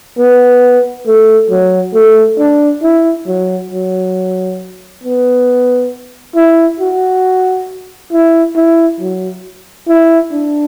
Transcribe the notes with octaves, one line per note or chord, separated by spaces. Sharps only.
B3
A3
F#3
A3
D4
E4
F#3
F#3
B3
E4
F#4
E4
E4
F#3
E4
D4